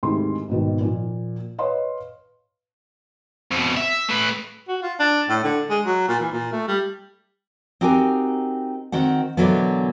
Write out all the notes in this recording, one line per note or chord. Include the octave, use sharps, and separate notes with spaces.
D2 G#2 C3 D#3 E4 C6
G#1 G#2 B2 D#3
A#2 F3
B4 C#5 D#5 F5 C6
F2 B2
E5
A3 B4
F#4
F4
D4
A2
D3
G#3
F#3
A#2
E3
A#2
A3
G3
C4 D#4 F#4 G4 A#4 G#5
D#3 C4 F#4 F#5
B2 D3 E3 F#3 A#3 B3